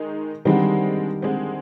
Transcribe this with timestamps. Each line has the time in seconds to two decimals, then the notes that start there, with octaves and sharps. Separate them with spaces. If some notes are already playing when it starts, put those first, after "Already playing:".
Already playing: D#3 G#3 D#4
0.45 D3 D#3 G3 G#3 C4
1.22 D3 G#3 C4